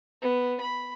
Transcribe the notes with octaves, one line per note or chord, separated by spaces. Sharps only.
B3
B5